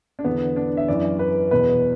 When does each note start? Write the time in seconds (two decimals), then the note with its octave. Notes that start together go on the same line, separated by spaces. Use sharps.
0.19 D4
0.24 E2 D3 B3
0.56 D4
0.77 E5
0.88 F#2 E3 D5
1.19 B4
1.51 E2 B2 B4